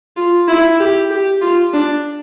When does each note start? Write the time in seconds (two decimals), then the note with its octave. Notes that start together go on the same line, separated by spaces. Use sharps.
0.16 F4
0.48 E4
0.79 G4
1.10 G4
1.41 F4
1.73 D4